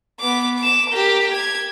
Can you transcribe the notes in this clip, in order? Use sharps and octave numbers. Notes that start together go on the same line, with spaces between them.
B3 D6
D6 E7
G4 A#4
G#6